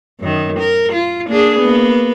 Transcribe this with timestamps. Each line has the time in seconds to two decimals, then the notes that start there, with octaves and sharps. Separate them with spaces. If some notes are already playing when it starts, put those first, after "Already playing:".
0.20 F#2 D#3
0.59 A#4
0.93 F4
1.28 A#3 D4 G#4
1.59 A#3 B3